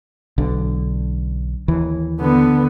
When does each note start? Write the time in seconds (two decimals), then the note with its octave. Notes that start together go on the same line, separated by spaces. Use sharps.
0.38 B1 D3
1.68 D#2 E3
2.20 D3 B3